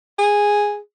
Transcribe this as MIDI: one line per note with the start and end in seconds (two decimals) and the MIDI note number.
0.19 0.78 68